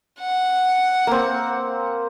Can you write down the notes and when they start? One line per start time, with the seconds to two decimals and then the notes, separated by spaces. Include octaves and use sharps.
0.20 F#5
1.07 A#3 C4